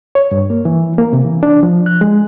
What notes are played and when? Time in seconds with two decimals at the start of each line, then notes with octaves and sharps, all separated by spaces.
0.15 C#5
0.31 G2
0.50 A#3
0.65 E3
0.98 A#3
1.13 C3
1.25 E3
1.43 D4
1.63 F3
1.86 F#6
2.01 G#3